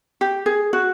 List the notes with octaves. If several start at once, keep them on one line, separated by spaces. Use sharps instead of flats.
G4
G#4
F#4